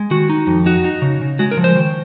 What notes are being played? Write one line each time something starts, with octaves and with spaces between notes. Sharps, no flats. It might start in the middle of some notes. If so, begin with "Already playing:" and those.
Already playing: G#3
D#3 F#4
D#4
F2
D#4 F#4
D#4
C#3
C#3
G#3 F#4
A#4
F3
C5
D#3